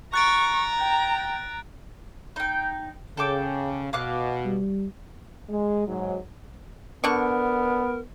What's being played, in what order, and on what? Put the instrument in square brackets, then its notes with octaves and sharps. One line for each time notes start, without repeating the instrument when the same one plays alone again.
[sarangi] A#5 [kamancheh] C#6 [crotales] F#6 A6 D7
[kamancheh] G5
[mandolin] D#4 G5
[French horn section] C#3 [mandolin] A4 G5 D6
[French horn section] B2 [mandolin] F5 D6 F#6
[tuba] G3
[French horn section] G#3
G#2 F#3
[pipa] D3 C#6 [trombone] B3 [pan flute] A#4